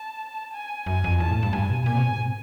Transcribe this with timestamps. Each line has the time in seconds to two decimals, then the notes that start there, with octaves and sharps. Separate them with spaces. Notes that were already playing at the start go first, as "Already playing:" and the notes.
Already playing: A5
0.53 G#5
0.86 F#2 G#5
1.04 F2
1.20 E2 A5
1.31 A2
1.43 G2
1.53 G2 G#5
1.69 B2
1.86 A#2 G#5
1.94 C3
2.03 B2
2.10 G#2